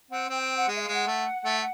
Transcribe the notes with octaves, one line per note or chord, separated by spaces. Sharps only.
C4 F#5
C4 G5
G5
F#5
G#3
E5
F5
G#3
F#5
A3
A3